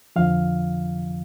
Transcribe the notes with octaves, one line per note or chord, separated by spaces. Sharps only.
F2 D3 F3 F5